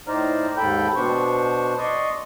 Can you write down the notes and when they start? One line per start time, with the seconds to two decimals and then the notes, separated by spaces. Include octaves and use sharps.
0.08 A2 D#4 C5 D5 A#5 F6
0.57 D#2 G#2 A4 G5 B5 G6
0.96 B2 B3 D4 C5 C#6
1.78 D5 D#5 C6 C#6 D#6